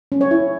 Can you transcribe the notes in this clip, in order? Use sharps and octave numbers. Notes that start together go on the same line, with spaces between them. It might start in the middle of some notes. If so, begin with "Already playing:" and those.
C#4
C#5
E4